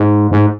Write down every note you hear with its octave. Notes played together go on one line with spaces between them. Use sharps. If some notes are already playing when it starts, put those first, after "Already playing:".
Already playing: G#2
G#2